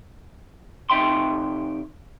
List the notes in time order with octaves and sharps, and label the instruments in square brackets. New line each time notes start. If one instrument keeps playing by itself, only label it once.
[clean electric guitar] C3 D#4 E5 G5 C6